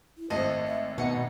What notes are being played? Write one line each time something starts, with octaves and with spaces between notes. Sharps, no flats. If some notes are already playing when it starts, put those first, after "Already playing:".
E4
G#1 A3 C5 D#5 A5
E5
B2 D#4 F#5 C#7